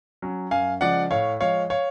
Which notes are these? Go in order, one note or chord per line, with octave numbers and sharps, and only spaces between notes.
F#3 C#4
F#2 F5 G#5
C#3 F3 G#3 D5 F#5
A2 C#5 F5
F3 G#3 C#5 F5
C#5 F5